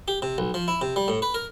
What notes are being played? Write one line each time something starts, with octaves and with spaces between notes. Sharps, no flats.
G4
C3
B1
F3
E4
C3
G3
A2
B4
A#4